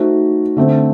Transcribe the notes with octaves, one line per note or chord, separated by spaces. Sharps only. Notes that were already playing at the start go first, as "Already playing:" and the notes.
Already playing: A3 D#4 F#4 C5
D3 A3 C4